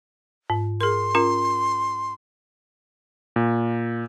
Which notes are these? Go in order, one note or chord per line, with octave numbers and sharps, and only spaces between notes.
G#2
G#4 A#4 C6
C#4 F4 A#4
A#2